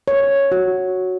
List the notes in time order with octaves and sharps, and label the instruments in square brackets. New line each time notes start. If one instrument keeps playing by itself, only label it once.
[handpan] C#5
F#4